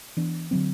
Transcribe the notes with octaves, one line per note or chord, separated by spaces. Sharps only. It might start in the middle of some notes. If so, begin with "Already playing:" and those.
E3 B3 D4
D3 F#3 C4